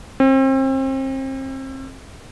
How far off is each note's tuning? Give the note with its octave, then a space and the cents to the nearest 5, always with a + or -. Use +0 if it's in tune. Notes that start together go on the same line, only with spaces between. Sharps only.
C4 +35